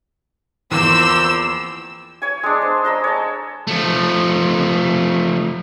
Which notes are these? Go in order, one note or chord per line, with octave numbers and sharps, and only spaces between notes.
E2 F3 A#3 C4 E6
C#5 G#5
G#3 D4
C5
D#5 A#5 E6
C#5 A5
F3 A3